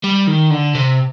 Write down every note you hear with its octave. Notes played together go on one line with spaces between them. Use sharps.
G3
D#3
D3
C3